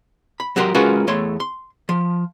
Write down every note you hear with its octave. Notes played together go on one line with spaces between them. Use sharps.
B5
F#3 F#4 G4 A#4 C6
G#3 C#4 F4 F#4 A#4 B4
E2 A3 C#5 C6
C6
F3